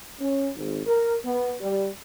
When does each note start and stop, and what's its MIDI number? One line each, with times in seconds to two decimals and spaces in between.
0.20 0.50 61
0.56 0.83 32
0.86 1.16 70
1.25 1.53 59
1.61 1.89 55